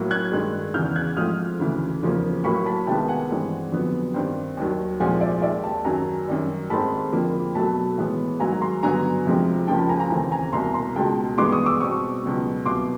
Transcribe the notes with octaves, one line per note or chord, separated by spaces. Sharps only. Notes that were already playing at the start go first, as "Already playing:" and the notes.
Already playing: A2 F#3 A#3
F#6 G#6
G2 D#3 G#3
E2 C#3 E3 F6 G6
F#6 G#6
G#2 F3 A3 C4 D#6 F6
D2 C#3 E3 A3
E2 C#3 F3 A#3
A2 F#3 A#3 B5 C#6
A5 B5
C2 C3 D#3 G#3 B3 G5 A5
F#5 G#5
G2 E3 G#3 C4
F2 D3 F#3 B3
G2 D#3 G3 C4
D#2 D#3 F#3
C2 A#2 F3 G#3 F#5 G#5
D5 E5
D#2 D#3 G#3 D5 E5
G5 A5
F#2 D#3 F#3 G#5 A#5
F#2 D#3 G3
G#2 D#3 G#3 C4 A5 B5
F2 D3 F3 A#3
B2 F#3 A3 A5 B5
A2 E3 G#3 B3
G#2 D#3 F#3 G#5 A#5
A#5 C6
G2 D3 F#3 B3 G#5 A#5
F2 C3 F3 G#3
C#2 C#3 F3 A#3 G5 A5
A5 B5
G#5 A#5
G#5 A#5
D#2 C#3 E3 A3 C4 G#5 A#5
G#5 A#5
C2 B2 G3 A#3 A#5 C6
A#5 C6
C#2 B2 G#3 G5 A5
G2 E3 G#3 B3 C6 D6
C#6 D#6
D6 E6
B2 G3 C4 C#6 D#6
C#2 B2 F#3 B3
C2 B2 F#3 B3 C6 D6